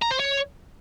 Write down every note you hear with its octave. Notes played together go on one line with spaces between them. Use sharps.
A#5
C5
C#5